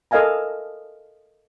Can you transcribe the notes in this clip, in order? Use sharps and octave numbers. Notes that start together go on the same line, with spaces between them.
A4 A#4 D#5 F5 G#5 A#5